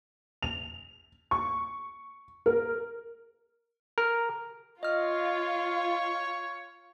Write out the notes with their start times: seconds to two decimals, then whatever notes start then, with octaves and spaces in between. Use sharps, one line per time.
0.43 F7
1.31 C#6
2.46 A#4
3.98 A#4
4.83 F4 C#5 D#5 F6